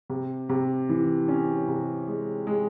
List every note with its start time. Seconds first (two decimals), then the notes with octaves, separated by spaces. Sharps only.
0.10 C3
0.49 C3
0.89 E3
1.28 C#4
1.68 C3
2.08 G#3
2.47 G#3